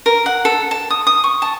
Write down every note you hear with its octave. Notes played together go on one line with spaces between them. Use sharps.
A#4
F#5
A4
A5
D#6
D#6
C#6
A5